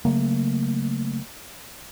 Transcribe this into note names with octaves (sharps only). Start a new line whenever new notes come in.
C#3 F#3 A3 A#3